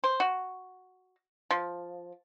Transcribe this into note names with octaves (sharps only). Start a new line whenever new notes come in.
C5
F#4
F3